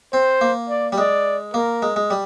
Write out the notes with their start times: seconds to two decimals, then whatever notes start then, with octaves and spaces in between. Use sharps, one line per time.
0.13 C4 C5
0.41 A#3
0.69 D5
0.92 G3
0.98 G#3 D5
1.54 A#3 A#4
1.82 G#3
1.96 G#3
2.10 G3